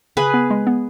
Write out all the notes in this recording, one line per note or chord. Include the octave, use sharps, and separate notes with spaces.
C#3 G#4 B4
B3
G#3
B3